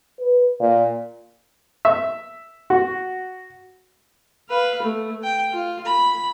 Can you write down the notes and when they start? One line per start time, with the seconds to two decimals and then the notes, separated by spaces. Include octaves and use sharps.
0.20 B4
0.60 A#2
1.85 E5
2.70 F#4
4.49 B4 F5
4.82 A3
5.24 G5
5.52 F4
5.85 B5